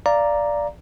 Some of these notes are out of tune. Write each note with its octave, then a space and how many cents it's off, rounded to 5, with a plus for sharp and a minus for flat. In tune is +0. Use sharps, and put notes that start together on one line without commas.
D5 +0 F5 -15 A#5 +0